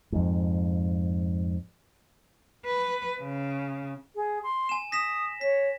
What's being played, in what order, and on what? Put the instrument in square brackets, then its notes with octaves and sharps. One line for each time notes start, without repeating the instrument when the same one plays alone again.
[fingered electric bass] F2 G#2
[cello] B4
C#3
[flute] G#4
C6
[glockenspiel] G#5 E7
[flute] D#6 [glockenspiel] A#6 B6 E7
[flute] C#5 [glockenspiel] B6